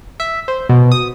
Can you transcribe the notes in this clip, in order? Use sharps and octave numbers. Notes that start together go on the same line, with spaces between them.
E5
C5
B2
D#6